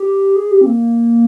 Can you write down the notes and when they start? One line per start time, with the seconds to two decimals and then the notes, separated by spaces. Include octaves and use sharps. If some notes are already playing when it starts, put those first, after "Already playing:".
Already playing: G4
0.36 G#4
0.51 G4
0.61 C4
0.66 A#3